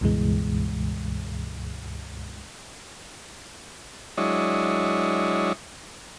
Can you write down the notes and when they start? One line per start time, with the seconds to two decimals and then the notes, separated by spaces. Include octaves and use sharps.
0.01 C#2 G2 B2 E3 G#3
4.17 F#3 G#3 D4 E4 C#5 D#5